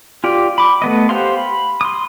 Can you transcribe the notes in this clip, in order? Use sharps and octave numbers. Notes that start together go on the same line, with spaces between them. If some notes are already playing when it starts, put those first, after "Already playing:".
F4 G4 D5
B5 D6
A3 B3 D#5
G4 C5 F5 F#5 C6
B5
C6 D#6